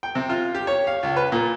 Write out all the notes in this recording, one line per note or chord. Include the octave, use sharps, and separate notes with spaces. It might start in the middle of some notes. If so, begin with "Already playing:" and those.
G5
C3
F4
G4
C#5
F5
C#2
B4
A#2